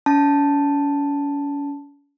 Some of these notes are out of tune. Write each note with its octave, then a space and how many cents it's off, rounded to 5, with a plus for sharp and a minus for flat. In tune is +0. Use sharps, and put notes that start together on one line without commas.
C#4 +40 A5 +0